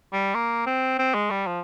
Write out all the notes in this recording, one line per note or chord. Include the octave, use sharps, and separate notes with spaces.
G3
A#3
C4
C4
G#3
G3
F3